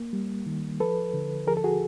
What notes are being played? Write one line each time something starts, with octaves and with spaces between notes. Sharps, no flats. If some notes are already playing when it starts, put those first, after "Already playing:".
Already playing: A#3
G3
D#3
F3 A4 B4
D3
F3 G#4 A#4
A4
F#4 G#4